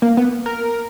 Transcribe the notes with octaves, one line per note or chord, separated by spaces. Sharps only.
A#3
B3
A#4